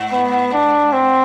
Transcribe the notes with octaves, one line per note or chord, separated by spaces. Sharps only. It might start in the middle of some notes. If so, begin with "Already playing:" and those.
Already playing: G#2
B3
D4
C4